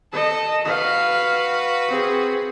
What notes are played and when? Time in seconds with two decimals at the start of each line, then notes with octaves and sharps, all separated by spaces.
0.13 A4 D#5
0.65 F#4 B4 F5
1.88 C4 G#4